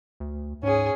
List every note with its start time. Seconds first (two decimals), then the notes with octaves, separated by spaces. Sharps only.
0.20 D2
0.63 G#2 C#4 G#4